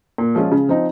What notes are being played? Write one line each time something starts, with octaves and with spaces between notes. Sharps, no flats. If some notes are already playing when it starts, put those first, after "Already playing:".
A#2
F3 G#3 C#4 F4
C#3
F3 C4 D#4